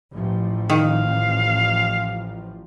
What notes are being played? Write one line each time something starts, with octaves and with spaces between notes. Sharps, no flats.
A1 F3
D#3 F5